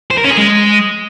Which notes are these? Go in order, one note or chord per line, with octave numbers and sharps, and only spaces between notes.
C5
A#4
C#4
G#4
G#3